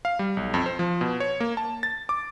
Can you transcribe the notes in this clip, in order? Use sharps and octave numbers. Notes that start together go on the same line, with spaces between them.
F5
G3
B1
F2
C5
F3
B2
C#5
A#3
A5
A6
D6